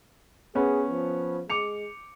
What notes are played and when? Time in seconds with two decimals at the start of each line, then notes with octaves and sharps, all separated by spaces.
0.55 B3 C#4 G#4 B4
0.90 F3
1.50 G#3 D6 C#7 F7